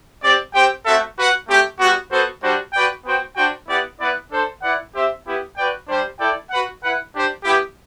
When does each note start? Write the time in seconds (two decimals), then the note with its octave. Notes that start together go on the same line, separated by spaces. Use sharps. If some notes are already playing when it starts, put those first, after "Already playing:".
0.22 C4 G4 D5
0.54 C4 G4 C5 G5
0.85 A3 C4 F#4 A4 E5
1.16 F#4 B4 F#5
1.47 A3 C4 G4
1.79 G3 B3 F#4
2.11 B3 F#4 A4 C5
2.42 G3 D4 F#4 C5
2.73 F#4 B4 D5 G5
3.05 B3 F#4 C5 G5
3.36 D4 F#4 C5 G5
3.67 B3 E4 G4 D5 F#5
3.99 B3 E4 B4 D5 F#5
4.30 D4 A4 C5
4.62 E4 B4 D5 F#5
4.93 C4 G4 C5 E5
5.25 B3 E4 G4
5.56 F#4 B4 D5 G5
5.88 G3 D4 G4 C5
6.18 E4 A4 D5 G5
6.51 F#4 B4 F#5
6.81 E4 B4 F#5
7.13 D4 G4 C5
7.44 B3 E4 G4